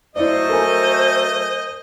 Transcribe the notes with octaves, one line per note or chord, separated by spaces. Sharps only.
F#3 A3 E4 C5 D5 D#5
A4 A#4 G#5